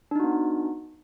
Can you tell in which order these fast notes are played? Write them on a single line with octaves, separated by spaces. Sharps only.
D4 D#4 F#4 B3